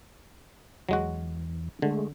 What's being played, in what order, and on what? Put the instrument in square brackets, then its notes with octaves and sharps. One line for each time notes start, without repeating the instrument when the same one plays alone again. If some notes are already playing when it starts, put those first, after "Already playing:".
[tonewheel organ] E2 [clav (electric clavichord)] F#3 G#3 F#4
[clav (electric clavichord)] D3 [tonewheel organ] G#3 A3